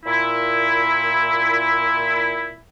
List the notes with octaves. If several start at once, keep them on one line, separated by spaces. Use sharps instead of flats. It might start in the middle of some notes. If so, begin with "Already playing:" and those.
A#2 E4